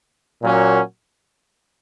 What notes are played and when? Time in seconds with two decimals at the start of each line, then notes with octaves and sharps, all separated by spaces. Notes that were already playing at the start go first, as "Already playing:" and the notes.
0.42 A#2 F#3 A#3 C#4 F#4